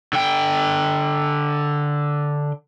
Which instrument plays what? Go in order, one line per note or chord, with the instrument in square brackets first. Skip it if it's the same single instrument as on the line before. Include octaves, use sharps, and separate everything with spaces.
[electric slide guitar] D3 G5